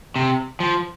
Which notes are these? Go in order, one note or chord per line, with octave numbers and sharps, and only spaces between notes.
C3
F3